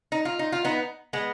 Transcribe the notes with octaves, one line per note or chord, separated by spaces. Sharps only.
D#4
F4
D#4
F4
B3 D#4
G#3 B3